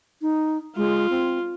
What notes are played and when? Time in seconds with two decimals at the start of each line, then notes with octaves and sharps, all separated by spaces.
0.22 D#4
0.76 G#3 F4
1.10 C4